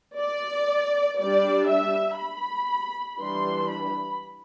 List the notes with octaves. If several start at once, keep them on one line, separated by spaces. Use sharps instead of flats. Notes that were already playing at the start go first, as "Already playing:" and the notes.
D5
G3 D4 D5
E5
B5
E3 G3 D4 C6
B5